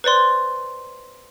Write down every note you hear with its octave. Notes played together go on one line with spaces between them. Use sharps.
B4 C5 D5 C6